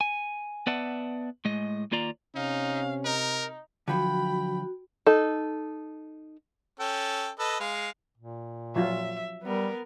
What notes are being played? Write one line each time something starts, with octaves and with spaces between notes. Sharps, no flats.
G#5
B3 B4 D5 E5 F#5 A5
A2 G#3 D#5
D#2 A#3 F4 D5 A#5
C3 C#4 D#4 F5
D#4 A#4
D3 F3 F#3 F#4 G5 B5
D#4 A4
C#4 A4 G5
A4 B4 D#5
G#3 F5
A#2
F3 F#3 F4 E5
G3 B3 A#4